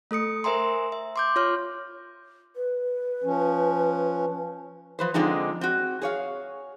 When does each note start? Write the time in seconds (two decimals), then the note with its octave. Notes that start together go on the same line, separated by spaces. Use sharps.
0.11 A3 A4 D#6 C#7
0.44 A#4 C5 E5 G#5 A#5 C6
0.92 E5
1.16 C6 D6 G6
1.36 F4 C#5 C6 F6
2.56 B4
3.24 F3 C#4
4.99 F3 B4 C5
5.14 D3 F3 G#3 C4 D#4
5.61 C4 F#4
6.02 G#4 C#5 F5